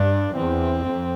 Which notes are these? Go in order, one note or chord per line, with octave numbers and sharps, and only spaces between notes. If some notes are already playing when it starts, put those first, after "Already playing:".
Already playing: G2 D4
E2 C4
F2